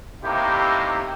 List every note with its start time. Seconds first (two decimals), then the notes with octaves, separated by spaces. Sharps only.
0.23 A2 C3 A#3 D#4 E4 G4